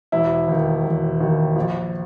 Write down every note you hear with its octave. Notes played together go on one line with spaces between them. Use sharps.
E1 E4
D#2 D#3
E1
D#2 D#3
A#1